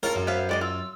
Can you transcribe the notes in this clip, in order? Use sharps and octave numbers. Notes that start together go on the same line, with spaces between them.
C#4 F4 A4 A#4
F#2
B3 C5 E5 F5
G#3 D5 D#5
F4 E6